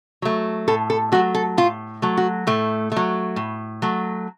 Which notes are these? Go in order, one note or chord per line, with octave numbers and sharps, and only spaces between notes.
F#3 A3
A2 A4
A4
F#3 A3 F#4
A4
A2 F4
F#3 A3
F#4
A2 A3
F#3 A3
A2
F#3 A3